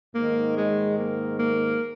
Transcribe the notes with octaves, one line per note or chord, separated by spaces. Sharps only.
G#2 D#3 A#3
G#3
A#3
A#3